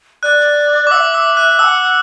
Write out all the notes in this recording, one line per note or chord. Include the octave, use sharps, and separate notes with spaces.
D5 F#6
D6
F#5 E6
E5
E6
F#6
F#5 A5 E6